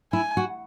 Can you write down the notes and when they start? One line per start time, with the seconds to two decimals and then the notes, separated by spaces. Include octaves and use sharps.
0.13 E4 G#5
0.37 F#4